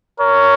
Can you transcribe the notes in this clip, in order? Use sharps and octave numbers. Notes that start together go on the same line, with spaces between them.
A#4 C#5